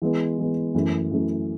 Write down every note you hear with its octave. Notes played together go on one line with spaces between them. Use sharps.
E3 G#3 B3
E3 G#3 B3
F#2 E3 A3
F#2 E3 A3